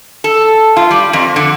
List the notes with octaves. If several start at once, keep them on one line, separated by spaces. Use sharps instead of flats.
A4
F4
G3
F2
D3